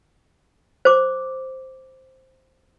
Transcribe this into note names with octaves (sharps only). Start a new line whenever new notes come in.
C5 D6